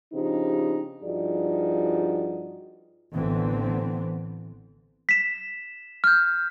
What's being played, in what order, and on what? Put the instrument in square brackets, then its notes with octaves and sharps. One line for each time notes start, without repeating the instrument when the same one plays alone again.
[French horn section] C#3 F3 C4 D4 D#4 G4
G2 F3 D#4 F#4 G#4 D5
[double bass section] A1 D3 E3 B3 C4
[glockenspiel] B6 E7
F6 G6